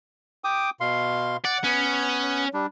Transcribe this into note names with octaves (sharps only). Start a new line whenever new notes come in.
G5 D6 D#6
B2 F5 C6
D5 F#5
B3 C#4 F#6
G3 D4